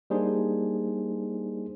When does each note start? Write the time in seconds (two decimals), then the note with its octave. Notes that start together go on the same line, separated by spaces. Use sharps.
0.10 G3 A#3 D4 D#4 G#4 C5